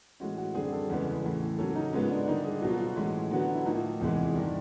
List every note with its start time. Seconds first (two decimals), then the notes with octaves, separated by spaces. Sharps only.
0.20 A2 E3 G#3 C#4 F#4
0.38 F#4
0.54 F#2 D3 G3 C4 G#4
0.72 A4
0.89 E2 C#3 E3 G#3 B3
1.24 A2 E3 A3
1.58 C#3 F#3 A#3 C#4 A4
1.75 D#4
1.93 G#2 F3 G#3 B3 C#4
2.10 D4
2.27 D3 G3 A#3 D#4
2.45 G#4
2.62 B2 F#3 B3 F#4
2.69 F4
2.76 F#4
2.96 A2 E3 G#3 C#4
3.31 D3 F#3 B3 F#4
3.55 E4
3.65 A2 F3 A#3 D#4
4.01 E2 C3 E3 G#3
4.35 G2 D#3 G3 D4